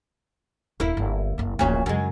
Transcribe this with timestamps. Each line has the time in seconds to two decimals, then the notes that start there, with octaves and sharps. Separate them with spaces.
0.80 D#1 A#3 E4
0.97 G1
1.38 F#1 C4
1.59 D1 A#1 A#2 C#4 F#4
1.86 F#2 C#3 F#3 G#3